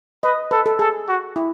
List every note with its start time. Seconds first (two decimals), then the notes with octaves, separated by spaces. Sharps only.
0.23 B4 D#5
0.51 A4 B4
0.66 A4
0.79 G#4 A4
1.08 F#4
1.36 E4